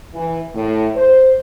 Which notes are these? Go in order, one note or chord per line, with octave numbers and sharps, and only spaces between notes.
E3
A2
C5